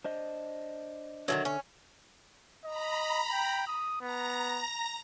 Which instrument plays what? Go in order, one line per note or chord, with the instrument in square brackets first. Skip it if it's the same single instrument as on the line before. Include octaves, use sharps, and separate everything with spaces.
[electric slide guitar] D4 C5 D#5
[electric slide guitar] D3 E5 [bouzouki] D#3 F3 F#3
[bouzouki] C#4
[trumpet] D#5 [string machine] A#5 B5
[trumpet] G5
D#6
[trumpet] B3 [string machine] A#5 A#6